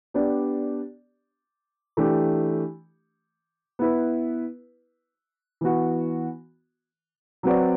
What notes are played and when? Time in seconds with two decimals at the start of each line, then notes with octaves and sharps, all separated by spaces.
0.14 B3 D4 G4 D5
1.97 E3 A3 D4 G4
3.79 B3 E4 B4
5.61 E3 B3 F#4
7.43 F#3 C4 F#4 B4 D5